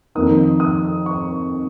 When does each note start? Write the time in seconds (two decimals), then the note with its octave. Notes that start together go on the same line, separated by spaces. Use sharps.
0.15 F2 D#3 A#3 D#4 D#6
0.60 D#6
1.06 C#6